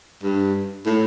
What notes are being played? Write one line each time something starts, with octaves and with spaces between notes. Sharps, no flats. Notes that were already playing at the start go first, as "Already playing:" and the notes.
G2
A2